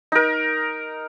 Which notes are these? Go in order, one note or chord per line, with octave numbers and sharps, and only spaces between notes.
D#4 A#4